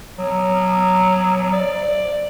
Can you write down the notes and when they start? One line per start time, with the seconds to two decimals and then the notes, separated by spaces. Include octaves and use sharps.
0.19 F#3
1.52 D5